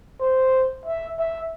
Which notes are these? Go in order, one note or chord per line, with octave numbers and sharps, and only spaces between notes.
C5
E5
E5